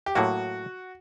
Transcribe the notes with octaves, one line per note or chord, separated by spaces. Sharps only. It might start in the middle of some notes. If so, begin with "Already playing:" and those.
G4
A2 F#3 A#3 F#4